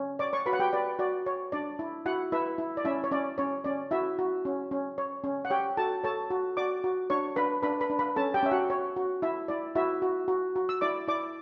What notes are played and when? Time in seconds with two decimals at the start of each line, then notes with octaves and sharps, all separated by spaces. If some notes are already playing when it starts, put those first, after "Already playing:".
Already playing: C#4
0.19 C#5 D5 D6
0.33 C#5 C#6
0.46 F#4 B4 B5
0.53 F#5
0.60 G4 G5
0.73 B4 D5
0.99 F#4 D5
1.26 C#5
1.52 D4 D5
1.79 E4
2.06 E4 F#4 F#5
2.32 E4 B4 E5
2.58 E4
2.77 D5
2.85 C#4 E4 E5
3.04 C#5
3.11 C#4 D5
3.38 C#4 C#5
3.64 C#4 D5
3.91 E4 F#4 E5
4.19 F#4
4.45 C#4
4.71 C#4
4.98 C#5
5.24 C#4
5.45 F#5
5.50 G4 C#5 G5
5.77 F#4 A4 A5
6.04 A4 C#5 A5
6.30 F#4
6.57 F#4 D5 D6
6.84 F#4
7.10 D4 C#5 C#6
7.36 D4 B4 B5
7.63 D4 B4 B5
7.81 B4 B5
7.90 D4
7.99 B4 B5
8.16 C#4 A4 A5
8.34 G4 G5
8.43 C#4 E5
8.51 F#4 F#5
8.70 C#5
8.96 F#4
9.22 E4 E5
9.48 E4 D5
9.75 E4 F#4 E5
10.02 F#4
10.28 F#4
10.56 F#4
10.69 E6
10.81 E4 D5 D6
11.08 E4 D5 D6